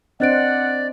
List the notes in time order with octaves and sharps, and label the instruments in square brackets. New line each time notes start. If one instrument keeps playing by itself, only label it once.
[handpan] C4 D4 C5 [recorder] D5 [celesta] D#5 F#6 D7 [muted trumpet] F#5